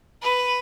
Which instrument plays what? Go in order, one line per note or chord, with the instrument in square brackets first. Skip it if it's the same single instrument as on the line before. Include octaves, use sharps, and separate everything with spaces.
[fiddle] B4